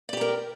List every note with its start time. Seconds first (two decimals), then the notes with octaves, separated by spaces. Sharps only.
0.09 D5
0.13 G4
0.17 G5
0.21 A#4